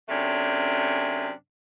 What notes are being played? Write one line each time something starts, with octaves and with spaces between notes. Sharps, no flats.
F#2 C3 A3 C#4 D4